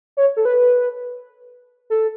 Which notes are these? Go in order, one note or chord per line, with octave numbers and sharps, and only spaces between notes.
C#5
A4
B4
A4